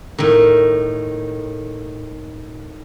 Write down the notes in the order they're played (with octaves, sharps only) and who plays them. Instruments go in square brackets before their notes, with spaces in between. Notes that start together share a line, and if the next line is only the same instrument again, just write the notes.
[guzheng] A2 D#3